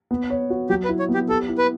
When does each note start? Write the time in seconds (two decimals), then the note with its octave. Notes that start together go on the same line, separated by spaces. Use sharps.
0.11 B3
0.30 C#5
0.50 F#4
0.70 F#3 G4
0.84 B4
0.89 E4
0.99 C#5
1.09 B3
1.14 G4
1.29 G4 A4
1.49 E4
1.58 B4